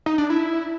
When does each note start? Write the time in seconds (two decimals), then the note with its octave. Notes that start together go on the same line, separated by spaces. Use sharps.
0.06 D#4
0.18 D4
0.30 E4